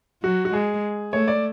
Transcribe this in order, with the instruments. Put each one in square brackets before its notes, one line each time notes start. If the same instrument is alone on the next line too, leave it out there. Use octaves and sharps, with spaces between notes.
[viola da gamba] F#3 [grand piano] F#4
[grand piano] F#4
[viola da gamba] G#3 [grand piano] G#4
[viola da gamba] A3 [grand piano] C#5
[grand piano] D5